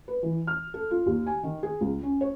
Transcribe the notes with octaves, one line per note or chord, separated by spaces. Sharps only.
B4
E3
F6
A4
F4
D#2
G#5
D#3
G#4
C#2
C#4
C#5